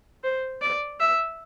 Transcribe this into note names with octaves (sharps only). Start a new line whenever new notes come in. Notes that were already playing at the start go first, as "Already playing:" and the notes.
C5
D5
E5